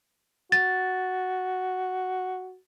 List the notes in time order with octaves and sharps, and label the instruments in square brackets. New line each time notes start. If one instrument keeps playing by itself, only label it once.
[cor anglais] F#4 [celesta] A6